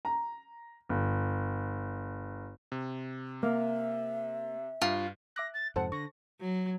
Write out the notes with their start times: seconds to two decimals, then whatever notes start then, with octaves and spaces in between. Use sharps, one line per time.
0.05 A#5
0.89 G1
2.72 C3
3.43 A#3 E5
4.82 G2 F4
5.36 E5 D6 F#6 A#6
5.54 A6
5.76 F2 G#2 C3 A4 C5 F#5 A5
5.92 D3 C#6 A#6
6.41 F#3